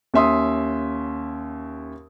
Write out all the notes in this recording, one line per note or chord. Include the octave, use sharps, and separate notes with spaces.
D#2 C#4 E5 C6 D#6